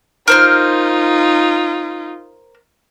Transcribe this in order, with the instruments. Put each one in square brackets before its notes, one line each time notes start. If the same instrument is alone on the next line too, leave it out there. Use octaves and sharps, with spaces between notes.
[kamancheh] D#4 F4 [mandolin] A#4 C5 F6